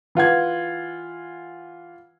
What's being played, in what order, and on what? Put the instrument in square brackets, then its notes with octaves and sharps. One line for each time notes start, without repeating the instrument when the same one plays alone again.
[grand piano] E3 F4 F#5 G#6